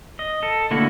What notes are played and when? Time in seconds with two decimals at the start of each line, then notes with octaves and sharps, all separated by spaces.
0.19 D#5
0.43 A4
0.71 D3 A3 A#3 E4 F#4